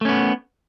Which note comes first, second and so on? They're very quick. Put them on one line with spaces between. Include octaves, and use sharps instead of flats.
A3 C#4 B3